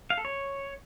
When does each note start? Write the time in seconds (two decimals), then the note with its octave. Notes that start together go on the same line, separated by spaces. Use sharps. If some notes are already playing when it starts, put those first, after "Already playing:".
0.10 F5
0.18 A4
0.25 C#5